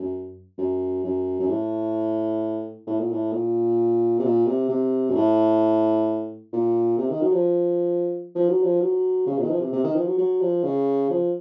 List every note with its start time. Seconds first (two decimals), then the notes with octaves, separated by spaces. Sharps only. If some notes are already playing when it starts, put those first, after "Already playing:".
Already playing: F#2
0.58 F#2
1.04 F#2
1.39 F#2
1.49 A2
2.87 A2
2.99 A#2
3.12 A2
3.32 A#2
4.19 C3
4.24 A#2
4.46 C3
4.69 C3
5.10 F#2
5.15 A2
6.52 A#2
6.98 C3
7.10 D#3
7.21 F#3
7.32 F3
8.35 F3
8.49 F#3
8.63 F3
8.81 F#3
9.27 C#3
9.38 A#2
9.44 D#3
9.50 F3
9.61 C3
9.73 C3
9.84 D#3
9.95 F3
10.07 F#3
10.18 F#3
10.41 F3
10.64 C#3
11.10 F3